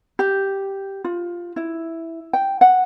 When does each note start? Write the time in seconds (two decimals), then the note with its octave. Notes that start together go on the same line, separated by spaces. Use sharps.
0.19 G4
1.04 F4
1.56 E4
2.33 G5
2.61 F#5